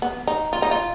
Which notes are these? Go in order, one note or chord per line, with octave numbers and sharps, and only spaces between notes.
B3
D#4
F4
D#4
F4